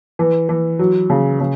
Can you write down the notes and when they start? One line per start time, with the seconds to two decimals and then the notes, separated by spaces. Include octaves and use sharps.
0.19 E3
0.49 E3
0.79 F#3
1.10 C#3
1.40 C#3